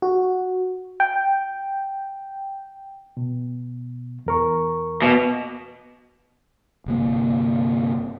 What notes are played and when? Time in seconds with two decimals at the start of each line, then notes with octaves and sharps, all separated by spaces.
0.02 F#4
1.00 G5
3.17 B2
4.26 E2 A#4 C#6
5.02 B2 D6
6.86 G1 C3 A#3